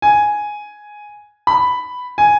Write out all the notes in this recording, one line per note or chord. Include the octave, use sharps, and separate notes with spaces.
G#5
B5
G#5